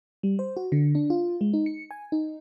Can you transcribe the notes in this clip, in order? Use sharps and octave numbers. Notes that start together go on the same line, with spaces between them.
G3
C5
F#4
D3
D4
F4
G#3
D#4
C#7
G#5
D#4